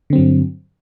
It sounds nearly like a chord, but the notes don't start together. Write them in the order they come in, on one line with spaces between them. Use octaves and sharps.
D3 C4 F#3 G2